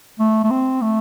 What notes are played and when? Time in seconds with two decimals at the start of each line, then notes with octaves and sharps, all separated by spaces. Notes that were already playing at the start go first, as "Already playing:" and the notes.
0.20 A3
0.44 A3
0.51 C4
0.81 A3